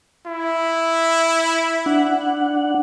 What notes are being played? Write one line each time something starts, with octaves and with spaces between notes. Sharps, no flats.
E4
D4 F#5